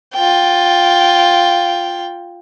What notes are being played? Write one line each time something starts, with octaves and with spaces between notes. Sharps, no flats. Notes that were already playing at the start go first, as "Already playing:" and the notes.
F4 G5